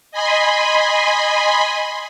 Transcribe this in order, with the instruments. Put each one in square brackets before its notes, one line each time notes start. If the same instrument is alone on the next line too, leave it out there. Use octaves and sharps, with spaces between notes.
[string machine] D#5 G#5 B5 C6